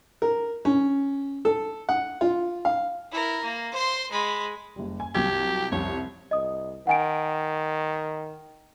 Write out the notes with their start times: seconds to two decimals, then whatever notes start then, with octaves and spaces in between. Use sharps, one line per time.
0.22 A#4
0.65 C#4
1.45 A4
1.89 F#5
2.21 F4
2.65 F5
3.12 E4 A#4
3.43 A#3
3.72 C5 C6
4.12 G#3 B5
4.76 F#1 G3
5.00 G#5
5.15 C2 F#3 G4 G#6
5.72 C2 F2 C3 C#5
6.31 C2 D#5 D#6
6.87 D#3 F#5 G#5 D7